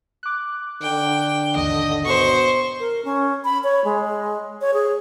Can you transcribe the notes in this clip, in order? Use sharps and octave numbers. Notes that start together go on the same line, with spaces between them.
D6 F#6
D3 G5
A1 D#2 G#2 D#5
B2 C5 C#6
A#4
C#4
B5
C#5
G#3
C#5
G#4